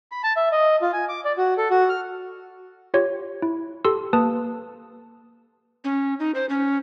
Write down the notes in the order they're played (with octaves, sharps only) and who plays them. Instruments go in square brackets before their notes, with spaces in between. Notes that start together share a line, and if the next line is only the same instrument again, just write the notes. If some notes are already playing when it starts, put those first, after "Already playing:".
[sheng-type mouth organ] B5
A5
E5
D#5
F4
G#5
D6
D5
F#4
A4
F#4
F6
[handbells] F4 G4 C#5
E4
G4 A4 C6 E6
A#3 B4 A5 D#6
[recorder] C#4
D#4
C5
C#4